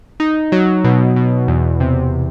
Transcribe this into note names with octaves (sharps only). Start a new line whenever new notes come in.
D#4
F#3
B2
B2
E2
C3